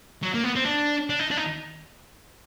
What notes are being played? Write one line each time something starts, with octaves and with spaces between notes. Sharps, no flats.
F#3
A#3
B3
C4
D4
D4
D#4
D4
D#4